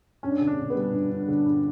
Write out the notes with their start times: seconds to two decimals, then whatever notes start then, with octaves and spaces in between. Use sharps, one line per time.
0.23 G2 C#4
0.31 D4
0.39 D3 C#4
0.47 D4
0.59 D3
0.70 B3
0.76 G3
0.93 G2
1.11 G2
1.28 D3
1.46 G2